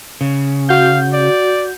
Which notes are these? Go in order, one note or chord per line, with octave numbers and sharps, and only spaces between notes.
C#3
F#4 F5 G6
D5